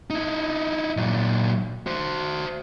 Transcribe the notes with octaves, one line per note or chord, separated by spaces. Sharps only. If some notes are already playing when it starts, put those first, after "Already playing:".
D#4 E4
A#2 F#3
F#4 C5